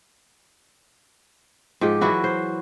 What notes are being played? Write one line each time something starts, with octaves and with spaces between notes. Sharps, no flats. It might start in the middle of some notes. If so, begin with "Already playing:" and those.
G#2 F3 G4
E3 F#3 E4 F#4
C5